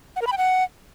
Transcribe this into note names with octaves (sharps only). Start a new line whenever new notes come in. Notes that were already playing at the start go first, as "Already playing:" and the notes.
F#5
A#4
B5
G5
F#5